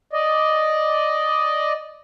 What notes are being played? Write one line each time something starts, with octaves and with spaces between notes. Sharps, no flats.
D5 D#5